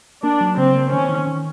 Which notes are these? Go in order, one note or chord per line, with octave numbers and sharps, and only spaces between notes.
A#3 D4
F#3
C#3 C4
A#3
D#3 C#4
D#3
D#3